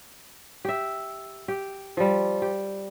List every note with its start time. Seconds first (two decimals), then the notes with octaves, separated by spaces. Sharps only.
0.65 G4 E5
1.48 G4
1.97 F3 G3
2.42 G4